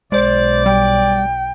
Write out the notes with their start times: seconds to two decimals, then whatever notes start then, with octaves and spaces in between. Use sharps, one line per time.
0.12 B1 G#3 C5 D5
0.66 G3 G5